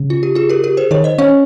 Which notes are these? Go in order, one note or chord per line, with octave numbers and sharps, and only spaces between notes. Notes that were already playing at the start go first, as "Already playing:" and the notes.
Already playing: C#3
F4
G4
F4 G#4
G4 A#4
G4 A#4
G#4 C5
D#3 A#4 C#5
C5 D#5
C#4 C#5 F5